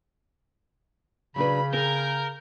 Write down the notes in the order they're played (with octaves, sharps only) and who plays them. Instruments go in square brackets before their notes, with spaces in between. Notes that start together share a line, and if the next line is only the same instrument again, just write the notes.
[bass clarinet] C#3 [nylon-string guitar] F#3 D4 B4 [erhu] B5
[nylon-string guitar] C4 G#4 [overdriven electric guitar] A#4 [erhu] G6